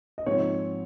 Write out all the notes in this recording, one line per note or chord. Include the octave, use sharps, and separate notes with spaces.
D#5
G#2 F3 C4 D#4 C#5